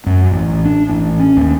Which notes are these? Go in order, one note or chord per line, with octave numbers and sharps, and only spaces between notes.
F#2
A1
D4
A1
C#4
D#2